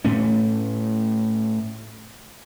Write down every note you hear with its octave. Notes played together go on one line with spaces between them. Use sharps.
A2 A3 C#4